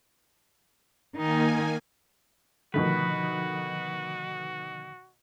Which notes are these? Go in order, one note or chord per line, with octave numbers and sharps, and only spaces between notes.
D#3 A#3 D#4 G#5
B2 D3 D#3 F3 A3 F#4 B4